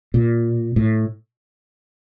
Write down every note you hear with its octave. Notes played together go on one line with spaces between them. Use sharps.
A#2
A2